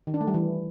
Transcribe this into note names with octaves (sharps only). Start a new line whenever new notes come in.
D#3
D4
A3
G3
E3